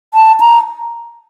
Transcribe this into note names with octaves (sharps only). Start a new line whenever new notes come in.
A5
A#5